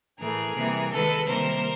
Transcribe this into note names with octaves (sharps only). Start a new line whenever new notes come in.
A2 E3 A3 G#4 A#4
C3 E3 G3 A#3
D#3 G#3 A4 B4
C3 D#3 G3 A#3 A#4 C5